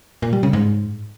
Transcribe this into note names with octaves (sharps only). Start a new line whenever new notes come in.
A#2
G3
C#3
G#2